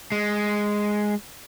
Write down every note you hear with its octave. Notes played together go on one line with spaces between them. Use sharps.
G#3